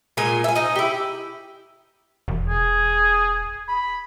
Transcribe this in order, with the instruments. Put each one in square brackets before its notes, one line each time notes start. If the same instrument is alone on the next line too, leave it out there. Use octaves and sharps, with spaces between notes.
[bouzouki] A#2 G#3 F4 G#5
E5 G#5
D#4 D#5
E4 G4
[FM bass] E1
[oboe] G#4
B5